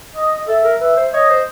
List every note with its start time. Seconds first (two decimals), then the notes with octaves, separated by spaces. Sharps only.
0.15 D#5
0.48 A4 E5
0.64 A#4
0.81 B4 E5
0.97 C5
1.13 C#5 D#5
1.30 C5